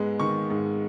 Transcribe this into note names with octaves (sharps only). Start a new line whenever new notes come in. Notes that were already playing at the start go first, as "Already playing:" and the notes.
Already playing: G#2 G#3 B3
D#3 C#6
G#2